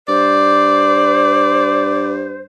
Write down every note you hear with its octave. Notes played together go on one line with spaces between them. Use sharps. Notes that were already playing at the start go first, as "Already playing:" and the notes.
G2 C5 D5